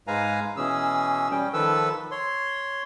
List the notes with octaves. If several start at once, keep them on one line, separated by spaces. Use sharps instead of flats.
G#2 G#3 B4 F5 G#5 A#5
B2 E3 C#4 G#4 E6
G3 C#4 G5
D#3 F3 A4 B4 E6
C#5 C6